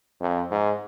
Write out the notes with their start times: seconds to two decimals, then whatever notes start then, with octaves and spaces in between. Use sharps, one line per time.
0.21 F2
0.51 G#2